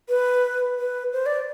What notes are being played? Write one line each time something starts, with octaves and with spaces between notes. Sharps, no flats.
B4
B4
C5
D5